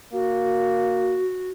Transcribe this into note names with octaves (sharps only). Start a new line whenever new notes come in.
A#3 F#4